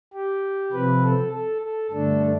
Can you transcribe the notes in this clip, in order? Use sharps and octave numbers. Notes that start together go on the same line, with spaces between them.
G4
C3 F3 C4 B4
A4
A4
A4
G2 D3 A3 D4 A4